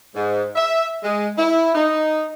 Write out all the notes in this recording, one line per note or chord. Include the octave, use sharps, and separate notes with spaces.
G#2
E5
G#3
E4
D#4